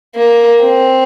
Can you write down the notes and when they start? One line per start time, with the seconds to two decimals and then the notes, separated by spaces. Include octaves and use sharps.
0.16 A#3
0.62 C4